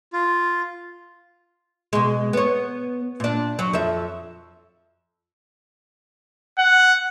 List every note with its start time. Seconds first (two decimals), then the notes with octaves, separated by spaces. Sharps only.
0.13 F4
1.93 B2 G#3
2.33 B3 C#5
3.20 A#2 D4
3.59 F#3
3.73 F2 E5
6.58 F#5